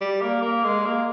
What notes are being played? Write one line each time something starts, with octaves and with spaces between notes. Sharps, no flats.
G3
A#3
A#3
G#3
A#3